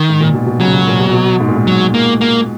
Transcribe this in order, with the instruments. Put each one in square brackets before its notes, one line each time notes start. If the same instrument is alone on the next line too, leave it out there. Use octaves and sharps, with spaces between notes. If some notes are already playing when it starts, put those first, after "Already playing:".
Already playing: [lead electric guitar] D#3
[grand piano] G#2
A#2
B2
B2
[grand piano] C#3 [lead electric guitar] F#3
[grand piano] B2
A#2
B2
B2
G#2
A#2
G#2
[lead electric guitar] F#3
A#3
A#3